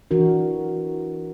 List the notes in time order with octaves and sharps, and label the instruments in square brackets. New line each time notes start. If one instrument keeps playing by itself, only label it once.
[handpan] E3 D4 F#4 A#4